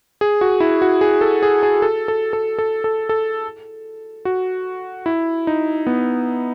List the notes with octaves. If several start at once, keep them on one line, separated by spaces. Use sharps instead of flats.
G#4
F#4
E4
F#4
G#4
A4
G#4
G#4
A4
A4
A4
A4
A4
A4
F#4
E4
D#4
B3